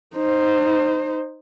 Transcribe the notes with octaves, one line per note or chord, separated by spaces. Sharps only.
D#4 C5